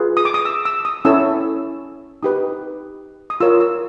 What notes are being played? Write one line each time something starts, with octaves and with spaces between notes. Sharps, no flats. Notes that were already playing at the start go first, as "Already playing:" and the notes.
Already playing: F4 G#4 B4
D#6
D6
D#6
E6
E6
D#6
C#4 E4 A4 C#5 E6
D#4 G4 B4 D#6
D#6
F4 A#4 C#5 E6
E6